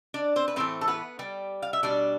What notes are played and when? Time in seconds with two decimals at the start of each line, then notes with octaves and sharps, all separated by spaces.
0.14 D4 D5
0.36 C4 C5
0.48 B4
0.56 A2 E3 A3 C4 C5
0.81 A4
0.88 B3 B4
1.19 G3 G4
1.62 F5
1.73 E5
1.83 B2 G3 D4 D5